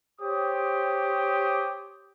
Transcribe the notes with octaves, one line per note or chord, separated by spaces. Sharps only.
G4 C5 C#5 D6 D#6